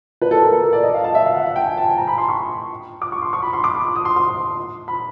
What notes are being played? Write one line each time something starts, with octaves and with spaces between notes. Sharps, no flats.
B4
A4
A#4
A4
A#4
D5
D#5
F5
A5
E5
F5
F#5
F#5
G5
G#5
A5
G#5
A#5
B5
C6
C#6
D6
C#6
C6
C#6
B5
C6
D6
D#6
C6
C6
B5